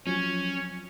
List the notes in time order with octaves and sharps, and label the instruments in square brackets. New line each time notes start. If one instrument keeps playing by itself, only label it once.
[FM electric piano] F3 F#3 [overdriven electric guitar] C#4 [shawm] C#5